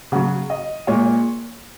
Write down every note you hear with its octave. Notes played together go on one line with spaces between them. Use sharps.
C#3 F#3 F#5
D#5
A#2 G#3 C#5